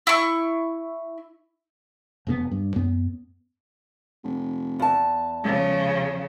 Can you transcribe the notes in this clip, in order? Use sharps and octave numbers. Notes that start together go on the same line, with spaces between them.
E4 C#6
F1 B2 B3
G2
F#2 B3
F1
E2 A5
C#2 C#3 F3